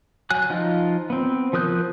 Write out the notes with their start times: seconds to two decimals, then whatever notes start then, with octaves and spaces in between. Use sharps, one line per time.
0.30 F#3 G#5 F#6
0.50 F3 D#4 F4
1.10 B3 C4
1.53 F3 A#4 D#6 F#6 G6